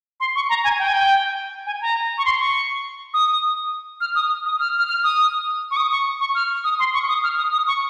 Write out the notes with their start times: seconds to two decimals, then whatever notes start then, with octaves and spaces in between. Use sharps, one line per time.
0.20 C6
0.36 C#6
0.49 A#5
0.64 G#5
0.79 G5
0.88 G#5
0.93 G5
1.67 G#5
1.81 A#5
2.18 C#6
2.25 C6
2.40 C#6
3.14 D#6
4.01 F6
4.15 D#6
4.46 D#6
4.60 F6
4.79 F6
4.89 F6
5.04 D#6
5.71 C#6
5.77 D#6
5.91 C#6
6.21 C#6
6.35 F6
6.64 D#6
6.79 C6
6.94 C#6
7.09 D#6
7.24 F6
7.38 D#6
7.52 D#6
7.67 C#6